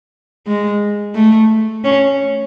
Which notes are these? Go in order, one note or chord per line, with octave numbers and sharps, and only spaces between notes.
G#3
A3
C#4